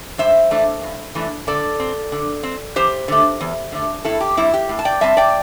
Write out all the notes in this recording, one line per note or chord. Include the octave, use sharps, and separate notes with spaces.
G2 C5 E5
E3 A3 D4
G2
E3 A3 D4
D3 A4 D5
C4
D3
C4
E2 G4 C5
D3 A3
E2
D3 A3
A2 E4 A4
G4
G3 C4 E4
G4
A2
A5
D5 G5
G3 C4 E5 A5
D5 G5